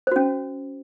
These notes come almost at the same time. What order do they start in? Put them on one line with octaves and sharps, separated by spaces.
C5 F#4 C#4